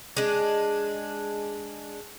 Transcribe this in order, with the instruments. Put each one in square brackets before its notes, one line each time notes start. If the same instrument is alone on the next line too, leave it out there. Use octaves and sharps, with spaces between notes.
[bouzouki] G#3 D4